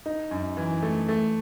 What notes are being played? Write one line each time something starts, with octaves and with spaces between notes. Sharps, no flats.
D#4
F#2
E3
A3
A3